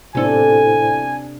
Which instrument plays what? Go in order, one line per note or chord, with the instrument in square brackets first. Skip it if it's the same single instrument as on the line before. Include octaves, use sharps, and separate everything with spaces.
[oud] E2 A4 [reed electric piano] A2 E4 C5 [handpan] C3 D4 [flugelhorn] G#5